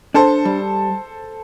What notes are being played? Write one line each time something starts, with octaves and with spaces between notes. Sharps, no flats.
D4 A4 C5
G3